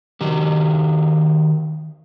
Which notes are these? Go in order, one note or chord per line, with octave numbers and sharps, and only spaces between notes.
D#3 F#4 G4